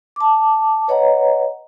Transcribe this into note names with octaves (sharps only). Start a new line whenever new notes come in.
A5 D6
B4 C#5 D#5 F#5 A#5